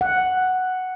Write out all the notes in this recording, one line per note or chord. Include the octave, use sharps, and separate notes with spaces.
F#5